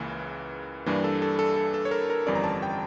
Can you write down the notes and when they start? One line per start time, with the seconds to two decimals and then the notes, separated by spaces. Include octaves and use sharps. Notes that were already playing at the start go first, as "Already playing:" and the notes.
Already playing: C#2 C#3 E3 A#3
0.86 G2 E3 G3 A#3 D4
1.04 A4
1.22 A4
1.39 A4
1.56 A4
1.74 A4
1.85 C#5
1.91 A#4
2.10 A#4
2.26 G1 F2 E3 G3 C#4 D5
2.35 A#5
2.44 A5
2.62 G5